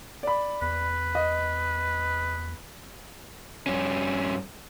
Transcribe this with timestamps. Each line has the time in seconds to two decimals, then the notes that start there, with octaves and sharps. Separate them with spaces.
0.23 D5 B5
0.62 E2 B4
1.15 D#5
3.66 G2 C#4